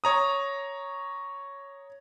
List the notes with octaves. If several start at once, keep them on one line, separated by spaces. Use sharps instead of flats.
C#5 A#5 D#6